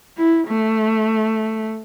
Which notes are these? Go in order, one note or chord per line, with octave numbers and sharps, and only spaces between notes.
E4
A3